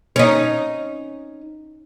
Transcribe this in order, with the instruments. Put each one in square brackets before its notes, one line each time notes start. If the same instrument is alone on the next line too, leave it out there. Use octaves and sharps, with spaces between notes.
[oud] C#4 D#4